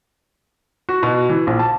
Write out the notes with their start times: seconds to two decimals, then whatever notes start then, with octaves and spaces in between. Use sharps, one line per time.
0.89 F#4
1.03 B2
1.30 E3
1.47 A#1
1.59 A5